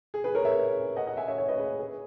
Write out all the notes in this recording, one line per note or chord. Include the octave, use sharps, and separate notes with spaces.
G#4
G#4 B4
A#4 C#5
C#5 E5
D#5 F#5
D#5 F#5
E5 G#5
C#5 E5
C#5 E5
B4 D#5
G#4 B4
G#4